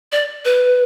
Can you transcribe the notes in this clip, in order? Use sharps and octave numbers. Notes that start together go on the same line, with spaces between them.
D5
B4